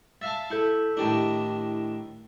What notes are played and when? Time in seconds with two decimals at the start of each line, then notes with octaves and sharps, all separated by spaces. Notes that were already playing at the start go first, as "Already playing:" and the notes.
0.22 E5 F5 A5 A6
0.50 E4 A4 G6 C#7
0.97 A2 D#3 D4 E4 G4